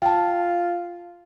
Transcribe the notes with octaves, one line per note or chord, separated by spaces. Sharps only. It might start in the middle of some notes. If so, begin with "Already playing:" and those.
F4 G5 A5